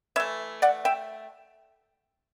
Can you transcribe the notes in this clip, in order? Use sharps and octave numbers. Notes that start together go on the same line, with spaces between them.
E3 A3 C#5 E5
D5 F#5
E5 G5